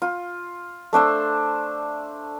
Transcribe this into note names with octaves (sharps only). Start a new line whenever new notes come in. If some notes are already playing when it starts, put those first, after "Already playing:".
F4
A3 D4 C5 E6